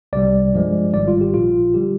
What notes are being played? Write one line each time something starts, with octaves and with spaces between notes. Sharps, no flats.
C2 C3 G3 D5
G2 F3 G#3
G#1 G#2 D#3 G3 D5
F4
G4
A#1 A#2 F3 F4
D3 G3 G4